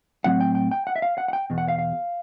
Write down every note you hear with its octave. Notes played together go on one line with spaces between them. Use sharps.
A2 F#3 A3 C4 F#5
G5
G5
G5
F#5
E5
F5
F#5
F#5
G5
E2 B2
F#5
F5
F5